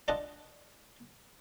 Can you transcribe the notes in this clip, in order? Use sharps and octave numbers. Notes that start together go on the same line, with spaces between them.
D4 F4 A4 D#5 F#5